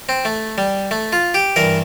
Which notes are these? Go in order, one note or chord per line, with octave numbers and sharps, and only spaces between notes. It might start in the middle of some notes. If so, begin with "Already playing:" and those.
C4
A3
G3
A3
F4
G4
G2 E3 A#4